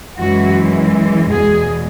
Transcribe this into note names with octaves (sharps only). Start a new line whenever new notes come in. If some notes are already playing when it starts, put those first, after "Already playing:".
F#2 E3 G#3 F#4
E2 B2 G#3 G#4